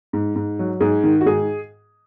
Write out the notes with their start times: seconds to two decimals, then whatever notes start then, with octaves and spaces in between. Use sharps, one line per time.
0.13 G#2
0.36 G#2
0.59 F#3
0.81 G#2 G#4
1.04 D#3
1.21 F#4
1.26 G#2 G#4